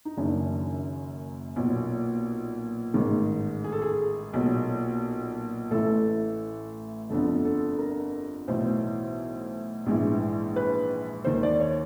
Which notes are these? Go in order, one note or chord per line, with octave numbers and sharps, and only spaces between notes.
D#4
F#1 F#2 D#3 D4
B1 A#2
A1 G#2 D#3
G#4
A4
G#4
B1 A#2
A1 A2 E3 A4
G1 F2 D3 A4
A4
A#4
B1 A2 E3 C5
A#1 G#2 E3
B4
D#2 D#3 C5
D5
C#5